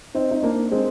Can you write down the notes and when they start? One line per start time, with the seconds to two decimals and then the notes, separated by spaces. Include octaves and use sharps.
0.15 C4 D#4
0.31 D#4
0.43 A#3 D4
0.71 G#3 C4